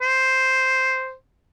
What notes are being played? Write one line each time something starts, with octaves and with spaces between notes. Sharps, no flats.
C5